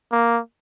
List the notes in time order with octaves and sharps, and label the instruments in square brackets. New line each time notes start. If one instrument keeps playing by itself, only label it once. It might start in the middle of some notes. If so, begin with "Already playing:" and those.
[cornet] A#3